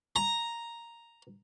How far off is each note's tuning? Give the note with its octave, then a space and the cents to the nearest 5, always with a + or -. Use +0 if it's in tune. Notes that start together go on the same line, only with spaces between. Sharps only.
A#5 +0